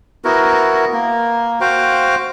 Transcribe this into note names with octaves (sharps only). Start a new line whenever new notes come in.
B3 E4 F#4 A#4
A#3
F#4 C5 F5 G5